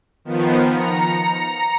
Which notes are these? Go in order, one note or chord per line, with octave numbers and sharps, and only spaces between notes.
D#3 F3 B3
A#5 C#7